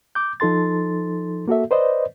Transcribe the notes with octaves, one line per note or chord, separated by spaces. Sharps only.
D6 G6
F3 D#4 A4 C6 A6
A#3 F#4 A4 E5
B4 C5 D5 D#5